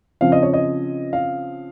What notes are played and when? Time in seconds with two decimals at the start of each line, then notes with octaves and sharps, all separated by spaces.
0.21 C#3 F3 C4 F5
0.32 D#5
0.43 C#5
0.53 D#5
1.13 F5